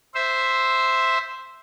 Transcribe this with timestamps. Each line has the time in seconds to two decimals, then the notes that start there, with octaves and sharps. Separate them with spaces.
0.15 C5 E5